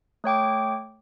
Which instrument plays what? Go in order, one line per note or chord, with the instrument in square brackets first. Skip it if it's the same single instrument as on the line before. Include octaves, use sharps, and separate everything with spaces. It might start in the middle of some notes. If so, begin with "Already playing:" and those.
[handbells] A3 C#5 G5 D6